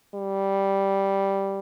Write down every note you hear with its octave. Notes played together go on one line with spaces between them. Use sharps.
G3